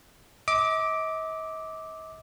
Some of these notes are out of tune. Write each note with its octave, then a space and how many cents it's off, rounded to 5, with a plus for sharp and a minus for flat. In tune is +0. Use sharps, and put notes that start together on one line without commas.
D#5 +45 D6 +0